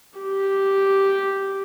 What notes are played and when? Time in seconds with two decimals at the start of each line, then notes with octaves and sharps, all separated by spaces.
0.19 G4